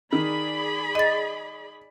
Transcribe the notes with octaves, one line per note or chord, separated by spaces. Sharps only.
D#3 G#4 D5 B5
D#5 A6